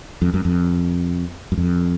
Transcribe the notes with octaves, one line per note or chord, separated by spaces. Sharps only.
F2
F#2
F2
F#2
F2